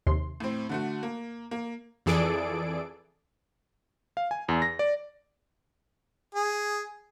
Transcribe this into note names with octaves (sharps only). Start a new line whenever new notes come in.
D#2 C3 C6
A2 C4
D3 A3 F#4
A#3
A#3
F2 E3 G#4 A4 D5 D7
F5
G#5
E2
A#6
D5
G#4